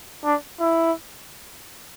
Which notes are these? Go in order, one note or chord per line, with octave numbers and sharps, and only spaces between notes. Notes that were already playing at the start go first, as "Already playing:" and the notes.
D4
E4